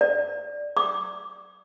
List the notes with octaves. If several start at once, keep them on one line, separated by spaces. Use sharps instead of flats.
D5
D6